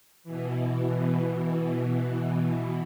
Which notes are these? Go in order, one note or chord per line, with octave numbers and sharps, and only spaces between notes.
B2 E3